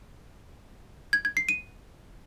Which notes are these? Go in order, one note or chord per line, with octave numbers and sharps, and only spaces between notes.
G#6
G#6
C7
D#7